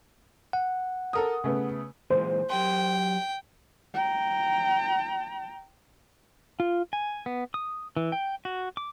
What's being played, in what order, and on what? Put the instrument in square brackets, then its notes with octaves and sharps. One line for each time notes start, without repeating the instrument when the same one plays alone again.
[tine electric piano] F#5
[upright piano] A4 A#4 D#6
C#3 A3 B3
[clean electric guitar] A#2 E3 G#3 [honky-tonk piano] C5
[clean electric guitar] F#3 G4 C6 [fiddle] G5
[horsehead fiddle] G5 A#5
[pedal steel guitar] F4
G#5
B3
D#6
E3
G5
F#4
D6